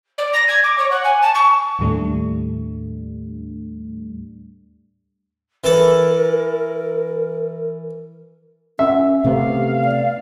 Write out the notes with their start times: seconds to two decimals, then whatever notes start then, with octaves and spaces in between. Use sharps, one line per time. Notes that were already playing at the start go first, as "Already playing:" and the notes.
0.17 D5
0.33 A#6
0.47 G#6
0.63 D6
0.78 C#5
0.90 F#5
1.04 G#5
1.21 A5
1.34 C#6
1.79 D#2 A2 G3 A3 D4
5.64 E3 A4 A#4
8.79 C#4 E5
9.25 C3 A3 B3 G4 F5
9.85 D5